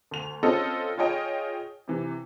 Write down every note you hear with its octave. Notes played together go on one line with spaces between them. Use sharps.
D2 F7
C4 C#4 F4 A4 D#5
F4 G#4 C#5 D#5 G5
C3 E3